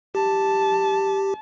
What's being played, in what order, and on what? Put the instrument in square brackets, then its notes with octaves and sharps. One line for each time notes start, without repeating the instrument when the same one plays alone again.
[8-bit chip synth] G4 [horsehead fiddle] A5